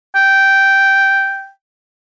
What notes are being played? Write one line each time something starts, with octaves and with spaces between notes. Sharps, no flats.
G5